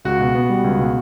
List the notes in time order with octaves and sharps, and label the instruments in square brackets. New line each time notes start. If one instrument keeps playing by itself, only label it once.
[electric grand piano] C#2 [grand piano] F#4
[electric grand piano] B2
B3
G3
C#2
B2